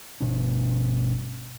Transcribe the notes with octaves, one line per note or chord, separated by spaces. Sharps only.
G1 C#2 B2 D4